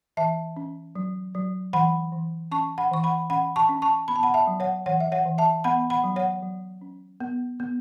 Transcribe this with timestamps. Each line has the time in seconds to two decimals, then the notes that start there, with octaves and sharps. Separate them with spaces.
0.17 E3 E5 A5
0.57 C#4
0.95 F#3
1.35 F#3
1.73 E3 F#5 B5
2.12 E3
2.52 C#4 A5 C#6
2.78 F#5 B5
2.91 E3 C#6
3.04 F#5 B5
3.30 C#4 F#5 B5
3.56 A5 C#6
3.69 C#4
3.82 A5 C#6
4.08 B3 B5
4.16 A5
4.23 F#5 B5
4.34 E5 A5
4.47 F#3
4.60 C#5 F#5
4.86 E3 C#5 F#5
5.00 E5
5.12 C#5 F#5
5.25 E3
5.38 E5 A5
5.64 B3 F#5 B5
5.90 F#5 B5
6.04 F#3
6.16 C#5 F#5
6.43 F#3
6.81 C#4
7.20 B3
7.60 B3